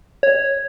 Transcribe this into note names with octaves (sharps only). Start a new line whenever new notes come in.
C#5